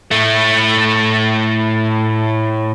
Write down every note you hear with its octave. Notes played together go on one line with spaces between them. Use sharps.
A2 A3